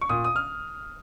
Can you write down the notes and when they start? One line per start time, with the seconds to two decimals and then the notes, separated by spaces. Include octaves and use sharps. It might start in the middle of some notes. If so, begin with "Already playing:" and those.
0.01 C#6
0.09 A#2 D#6
0.24 D#6
0.36 F6